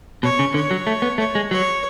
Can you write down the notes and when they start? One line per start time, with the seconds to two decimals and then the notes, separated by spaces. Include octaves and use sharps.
0.23 B2 C#5
0.39 C#3
0.54 D3 C#5
0.71 F#3
0.87 A3
1.02 B3
1.18 A3 C#5
1.35 G#3
1.51 F#3 C#5